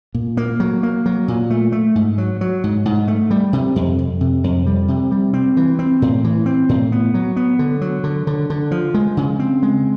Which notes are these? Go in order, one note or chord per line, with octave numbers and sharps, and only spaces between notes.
A#2
A#3
F#3
A#3
F#3
A#2
A3
A3
G#2
F#3
F#3
G#2
G#2
A3
G3
C3
F2
F2
C3
F2
G3
C3
G3
C4
E3
C4
A2
E3
C4
A2
B3
F#3
B3
D3
F#3
D3
D3
D3
F3
G#3
C#3
C4
G#3